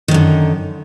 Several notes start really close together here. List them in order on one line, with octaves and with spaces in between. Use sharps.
D#3 F#2 D3